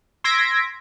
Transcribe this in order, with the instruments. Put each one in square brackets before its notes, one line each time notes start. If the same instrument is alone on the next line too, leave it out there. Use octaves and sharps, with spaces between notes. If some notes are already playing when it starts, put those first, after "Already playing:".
[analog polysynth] C6 E6 G#6 A#6 B6 D7